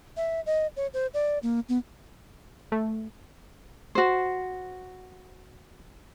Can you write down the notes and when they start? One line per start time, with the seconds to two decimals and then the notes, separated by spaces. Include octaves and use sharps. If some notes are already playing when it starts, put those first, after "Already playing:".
0.17 E5
0.46 D#5
0.76 C#5
0.94 C5
1.14 D5
1.43 A#3
1.69 B3
2.72 A3
3.95 F#4 C5